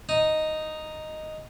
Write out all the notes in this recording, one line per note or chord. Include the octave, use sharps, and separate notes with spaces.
D#4